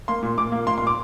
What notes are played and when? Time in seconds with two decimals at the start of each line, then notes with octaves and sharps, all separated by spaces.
0.08 A#3 C6
0.23 A#2
0.38 A#2 D6
0.52 A#3
0.67 A#3 C6
0.78 C6
0.82 A#2 D6